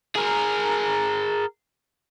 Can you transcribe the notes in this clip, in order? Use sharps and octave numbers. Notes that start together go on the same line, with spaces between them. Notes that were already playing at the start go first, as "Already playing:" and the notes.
G#4 A#4